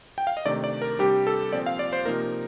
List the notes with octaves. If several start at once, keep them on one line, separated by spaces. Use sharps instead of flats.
G5
F5
D#5
C3 D#3 A3 D4 D5
D5
A#4
C3 G3 D4 G4
A4
A#2 F3 C4 D5
F5
D5
C5
C3 F3 A#3 D#4 A#4